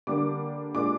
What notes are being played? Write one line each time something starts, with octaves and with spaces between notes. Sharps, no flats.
D3 G3 A#3 D4 D6
A#2 G#3 D4 D6